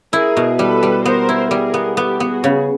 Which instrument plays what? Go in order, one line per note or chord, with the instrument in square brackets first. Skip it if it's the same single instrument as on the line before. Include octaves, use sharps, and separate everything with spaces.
[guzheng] E4 [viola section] G#4 A#4
[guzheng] B2
[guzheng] G3 [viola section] A4 B4
[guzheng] G3
[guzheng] B3 [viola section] A#4 C5
[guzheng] E4
[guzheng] G3 [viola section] G#4 A#4
[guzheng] B3
[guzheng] B3 [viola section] G4 A4
[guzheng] B3
[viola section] F#4 G#4
[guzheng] C#3